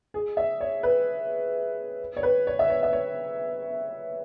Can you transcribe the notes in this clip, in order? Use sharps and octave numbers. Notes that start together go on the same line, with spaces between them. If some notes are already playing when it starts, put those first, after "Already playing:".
G#4
E5
C#5
B4
C#5
B4
C#5
E5
C#5
E5
C#5